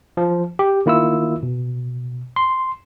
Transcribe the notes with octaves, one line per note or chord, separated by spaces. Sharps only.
F3
G4
D#3 A#3 E4 F4 E6
B2
C6